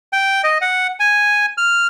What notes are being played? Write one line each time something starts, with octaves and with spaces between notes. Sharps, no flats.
G5
D#5
F#5
G#5
F6